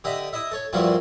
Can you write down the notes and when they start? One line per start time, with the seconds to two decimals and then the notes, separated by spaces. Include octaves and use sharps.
0.04 D3 G4 D#5 E5 B5
0.33 E4 D#5 E5
0.51 A4 C#5
0.73 G2 A#2 F3 G3 E4 F#4